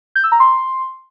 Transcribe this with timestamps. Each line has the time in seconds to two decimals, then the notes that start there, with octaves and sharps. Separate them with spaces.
0.15 G6
0.24 E6
0.32 A#5
0.40 C6